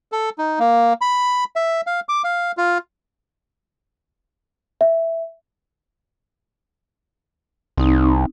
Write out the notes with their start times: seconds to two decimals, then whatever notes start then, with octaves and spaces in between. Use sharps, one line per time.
0.12 A4
0.38 D#4
0.59 A#3
1.01 B5
1.56 E5
1.87 F5
2.09 D6
2.24 F5
2.57 F4
4.81 E5
7.78 C2 C4 D#4